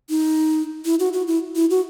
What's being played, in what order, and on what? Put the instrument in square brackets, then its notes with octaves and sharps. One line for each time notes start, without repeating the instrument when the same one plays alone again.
[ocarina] D#4
E4
F#4
F#4
E4
E4
F#4